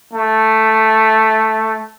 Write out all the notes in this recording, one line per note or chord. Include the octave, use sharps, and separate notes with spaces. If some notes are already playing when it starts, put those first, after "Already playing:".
A3